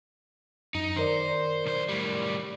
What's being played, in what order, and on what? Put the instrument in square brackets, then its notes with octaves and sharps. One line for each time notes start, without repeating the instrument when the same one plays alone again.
[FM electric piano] F#2 [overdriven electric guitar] D#4
[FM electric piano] D#3 A#4 D5 [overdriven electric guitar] C5
[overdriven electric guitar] B1 C5
A2 G3